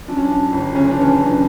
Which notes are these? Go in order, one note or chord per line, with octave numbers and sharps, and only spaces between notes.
F#2 D4
C#4
D4
F#2
G1
F#1 C#4
D4
E3 C#4
D4
F#2
D4